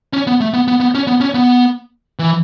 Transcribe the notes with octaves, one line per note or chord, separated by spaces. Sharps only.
C#4
B3
A3
B3
B3
B3
C#4
B3
C#4
B3
E3